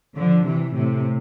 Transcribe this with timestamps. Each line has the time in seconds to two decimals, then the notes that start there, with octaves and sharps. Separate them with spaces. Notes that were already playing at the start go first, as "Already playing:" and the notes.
0.16 D3 F3
0.46 C3 E3
0.75 A2 C3